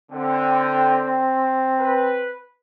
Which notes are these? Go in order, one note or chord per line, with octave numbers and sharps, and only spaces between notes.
D3 C4 G5
B4